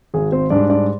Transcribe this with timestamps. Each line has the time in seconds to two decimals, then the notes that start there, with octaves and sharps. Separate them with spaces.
0.14 G#1 G#4
0.32 C4 C5
0.50 G#2 G3 D4 D5
0.69 D4 D5